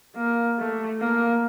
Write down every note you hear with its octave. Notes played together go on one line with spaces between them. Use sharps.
A#3
A3
A#3